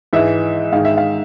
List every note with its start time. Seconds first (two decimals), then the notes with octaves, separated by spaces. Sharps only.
0.13 G#2 E3 G#3 E5
0.72 G#2 D#3 G#3 F5
0.85 E5
0.97 F5